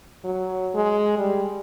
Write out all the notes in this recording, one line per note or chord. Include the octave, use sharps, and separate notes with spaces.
F#3
G#3
G3